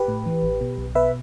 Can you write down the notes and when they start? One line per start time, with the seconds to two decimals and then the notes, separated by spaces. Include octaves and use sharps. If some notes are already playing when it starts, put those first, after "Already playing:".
Already playing: G4 B4
0.08 A2
0.26 E3
0.43 A1
0.60 B2
0.78 B1
0.95 B2 B4 E5